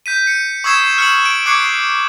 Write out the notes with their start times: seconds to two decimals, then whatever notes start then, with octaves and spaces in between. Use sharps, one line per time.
0.06 G6 B6 D#7
0.27 C#7
0.64 C#6 D#6 E6 G#6 C7 E7
0.98 F6 C#7 E7 F#7
1.26 D7
1.46 C#6 D6 F#6 G#6 C7 C#7